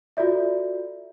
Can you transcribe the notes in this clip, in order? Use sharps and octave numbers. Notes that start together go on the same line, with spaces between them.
F4 F#4 A4 D5 E5